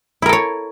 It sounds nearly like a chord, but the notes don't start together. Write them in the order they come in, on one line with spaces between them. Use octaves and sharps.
E4 A#4 A4 C#5